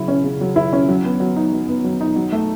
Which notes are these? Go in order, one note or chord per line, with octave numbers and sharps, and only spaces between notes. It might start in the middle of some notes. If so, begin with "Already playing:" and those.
Already playing: C#3 F#3 E4
C#4
C#3
F#3
E4
C#4
F#3
B3
F#3
D#4
F#3
B3
F#3
D#4
F#3
A3